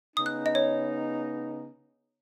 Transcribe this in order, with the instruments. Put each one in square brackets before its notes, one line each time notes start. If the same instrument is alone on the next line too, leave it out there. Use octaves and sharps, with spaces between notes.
[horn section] C#3 B3 D#4 [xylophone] D#6
[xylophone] F#6
D#5
C#5